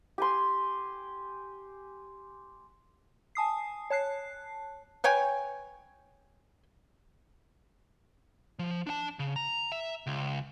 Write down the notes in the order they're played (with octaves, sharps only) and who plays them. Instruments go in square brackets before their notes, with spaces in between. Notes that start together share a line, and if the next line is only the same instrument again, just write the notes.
[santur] G4 G#5 C6
[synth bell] G#5 A5 D#6 C7
C#5 A5 F#6 C7
[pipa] B4 C#5 G5 G#5
[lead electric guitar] F3
D4 A5
C#3
A#5
E5
C#2